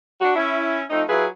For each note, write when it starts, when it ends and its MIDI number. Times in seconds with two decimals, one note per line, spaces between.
0.21 0.34 62
0.21 0.34 66
0.35 0.83 61
0.35 0.83 64
0.90 1.02 53
0.90 1.02 57
0.90 1.02 60
0.90 1.02 63
1.08 1.25 54
1.08 1.25 64
1.08 1.25 65
1.08 1.25 68
1.08 1.25 71